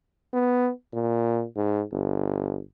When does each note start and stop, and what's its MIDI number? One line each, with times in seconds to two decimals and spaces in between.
0.33 0.70 59
0.93 1.44 46
1.56 1.83 44
1.92 2.60 31